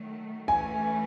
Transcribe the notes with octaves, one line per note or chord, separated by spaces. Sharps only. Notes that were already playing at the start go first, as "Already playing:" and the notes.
Already playing: D#3 F#3 A3
E3 A3 C#4 G#5